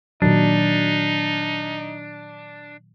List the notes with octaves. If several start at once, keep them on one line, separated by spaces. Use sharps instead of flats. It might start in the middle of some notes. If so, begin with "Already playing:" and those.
A#2 D#3 F#3 D4 D#4